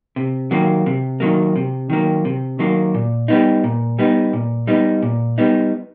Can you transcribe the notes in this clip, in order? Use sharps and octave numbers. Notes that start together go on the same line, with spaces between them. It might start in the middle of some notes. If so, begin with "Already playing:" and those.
C3
D#3 F#3 A#3
C3
D#3 F#3 A#3
C3
D#3 F#3 A#3
C3
D#3 F#3 A#3
A#2
G3 B3 D#4
A#2
G3 B3 D#4
A#2
G3 B3 D#4
A#2
G3 B3 D#4